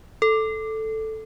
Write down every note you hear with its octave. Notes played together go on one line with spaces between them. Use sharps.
A4